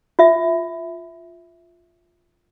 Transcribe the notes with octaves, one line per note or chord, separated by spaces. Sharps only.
F4 E5